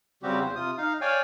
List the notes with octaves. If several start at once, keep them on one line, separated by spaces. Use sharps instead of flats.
C#3 G3 C4 F#4 G4
E2 C5
C3 F4 D#6
D#4 F5
C#5 D5 F5 G5 G#5